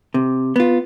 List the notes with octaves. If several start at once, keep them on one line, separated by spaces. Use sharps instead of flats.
C3
B3 F4